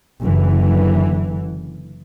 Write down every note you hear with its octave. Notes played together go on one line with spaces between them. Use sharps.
F#1 D3 E3